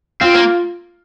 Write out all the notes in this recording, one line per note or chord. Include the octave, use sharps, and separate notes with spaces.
C4 F4
A#3